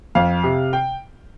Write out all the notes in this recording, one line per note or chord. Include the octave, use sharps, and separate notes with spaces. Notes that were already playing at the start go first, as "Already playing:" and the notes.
F2 F5
C3
G5